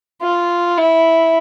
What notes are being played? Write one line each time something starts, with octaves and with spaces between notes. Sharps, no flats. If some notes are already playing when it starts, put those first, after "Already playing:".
F4
E4